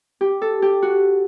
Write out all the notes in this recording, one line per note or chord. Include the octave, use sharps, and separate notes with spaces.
G4
A4
G4
F#4